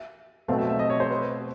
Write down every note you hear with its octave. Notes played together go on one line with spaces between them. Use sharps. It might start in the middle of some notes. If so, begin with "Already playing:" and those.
Already playing: E5
B2 F#3 A3 C4 F5
E5
E5
D#5
C#5
C5
B4